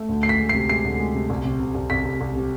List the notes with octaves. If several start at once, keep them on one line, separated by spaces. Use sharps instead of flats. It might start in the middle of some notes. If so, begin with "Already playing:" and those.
Already playing: A3
D2
D2 C7
B6
G#3
C3 C7
G#3 C7
D2
G#3
C3
C2
C3
C3
C2
C2 B6
C2
C2
C3